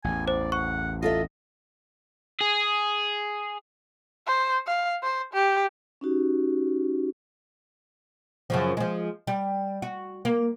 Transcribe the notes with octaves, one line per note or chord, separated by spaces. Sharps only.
A1 E2 G#5
C5 D5
F#5 C#6
F4 A4 D#5 E5
G#4
C5
F5
C5
G4
C#4 D#4 F#4 G4
F#2 C#3 F3
F3 G#3
G3
F#4
A#3